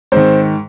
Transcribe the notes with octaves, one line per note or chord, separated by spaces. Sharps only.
G#2 D#3 C4 C5